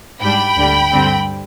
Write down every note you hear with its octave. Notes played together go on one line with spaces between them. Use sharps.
G#2 G3 D4 G5 B5
D2 D3 G3
G2 D3 G3 C4